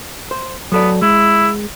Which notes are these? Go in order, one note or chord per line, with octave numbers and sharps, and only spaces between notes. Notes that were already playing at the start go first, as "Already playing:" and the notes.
C5
F#3 B3 A4 D5
G#3 E4